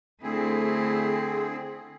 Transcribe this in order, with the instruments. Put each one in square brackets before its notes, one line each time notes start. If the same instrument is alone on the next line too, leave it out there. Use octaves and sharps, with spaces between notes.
[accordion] D3 C4 G#4 [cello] A3 E4